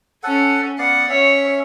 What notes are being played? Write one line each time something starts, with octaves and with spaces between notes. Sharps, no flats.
C#4 A4 F#5 G#5
B3 D5 F5 F#5
C#4 C#5 E5